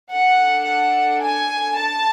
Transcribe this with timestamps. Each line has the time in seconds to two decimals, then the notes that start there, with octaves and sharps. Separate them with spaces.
0.13 D4 A4 F#5
0.68 F#5
1.23 G#5
1.78 A5